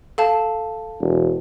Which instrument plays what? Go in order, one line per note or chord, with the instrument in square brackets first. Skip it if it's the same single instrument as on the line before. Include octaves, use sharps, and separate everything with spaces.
[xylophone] A4 F5 A5
[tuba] E1